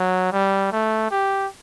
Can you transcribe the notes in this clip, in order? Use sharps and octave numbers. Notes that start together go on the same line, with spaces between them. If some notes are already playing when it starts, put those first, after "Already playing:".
Already playing: F#3
G3
A3
G4